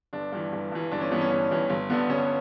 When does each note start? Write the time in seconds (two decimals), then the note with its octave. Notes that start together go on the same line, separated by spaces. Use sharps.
0.13 G1 D4
0.32 G2 E3
0.53 G1
0.72 G2 E3
0.92 G1 D4
1.01 C#4
1.11 G2 E3 B3
1.21 C#4
1.31 G1
1.51 G2 E3
1.70 G1
1.90 G2 D3 B3
2.10 G1 C#4